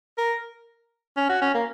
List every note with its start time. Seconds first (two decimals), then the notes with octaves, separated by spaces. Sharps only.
0.18 A#4
1.17 C#4
1.30 F#4
1.41 C#4
1.54 A#3